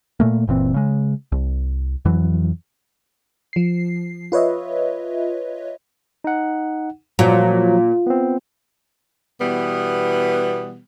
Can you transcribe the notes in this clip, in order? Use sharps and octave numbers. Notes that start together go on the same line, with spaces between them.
A#2 A3 A#3
F#1 A#2 E3 C4
C#3 G#3
C2
F2 E3 F#3
F3 C7
F4 B4 C#5 D#5 E5
D#4 F#5
A#2 F3 F#3
B3 C4
B2 E3 G3 B3